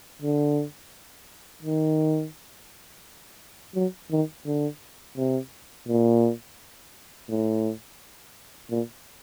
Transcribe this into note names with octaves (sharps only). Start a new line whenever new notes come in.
D3
D#3
F#3
D#3
D3
C3
A#2
A2
A#2